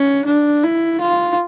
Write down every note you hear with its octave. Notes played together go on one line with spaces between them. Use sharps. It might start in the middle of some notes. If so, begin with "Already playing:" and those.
Already playing: C#4
D4
E4
F4